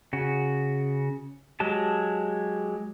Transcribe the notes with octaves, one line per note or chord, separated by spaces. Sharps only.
C#3 F#4
F#3 G#3 G4 A5